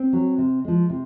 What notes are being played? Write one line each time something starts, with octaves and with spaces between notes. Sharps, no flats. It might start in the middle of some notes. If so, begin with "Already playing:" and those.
Already playing: C4
F#3
C3
F3 G#3
C3